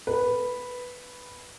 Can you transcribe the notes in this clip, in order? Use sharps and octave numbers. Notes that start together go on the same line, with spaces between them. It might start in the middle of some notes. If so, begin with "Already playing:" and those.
B4